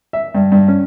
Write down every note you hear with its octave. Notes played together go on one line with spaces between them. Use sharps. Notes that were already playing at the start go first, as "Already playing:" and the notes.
E5
G2
G2
C#4